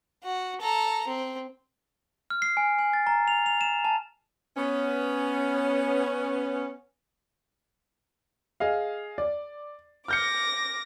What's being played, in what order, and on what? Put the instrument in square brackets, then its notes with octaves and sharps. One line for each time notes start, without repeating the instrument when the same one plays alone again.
[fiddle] F#4
A4 A#5
C4
[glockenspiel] F6
C7
G#5
G#5
A6
A#5
F7
F7
E7
A5
[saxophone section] B3 C#4
[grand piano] G#4 D#5 F5
D5
[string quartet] D6 A#6 [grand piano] F6 G6 C#7